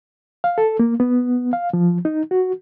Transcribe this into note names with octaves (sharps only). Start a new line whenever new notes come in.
F5
A4
A#3
B3
F5
F3
D#4
F#4